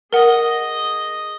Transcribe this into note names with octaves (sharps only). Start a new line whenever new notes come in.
G#4 A#4 D#5 F#5